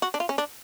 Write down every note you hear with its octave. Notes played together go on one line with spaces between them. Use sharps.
F#4
D4
F4
C#4
D4